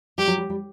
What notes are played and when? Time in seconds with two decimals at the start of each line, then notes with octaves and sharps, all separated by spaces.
0.18 G3 G4
0.28 F#3
0.37 G3
0.50 G3